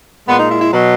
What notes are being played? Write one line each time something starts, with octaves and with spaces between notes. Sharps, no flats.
A#2 G#3 B3
D#4
E4
E4
B2 F#3